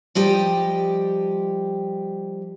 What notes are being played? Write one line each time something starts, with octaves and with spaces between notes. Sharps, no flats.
F3 G3 G4 D#5